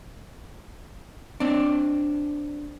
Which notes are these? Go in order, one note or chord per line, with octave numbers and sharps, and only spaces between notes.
C4 D4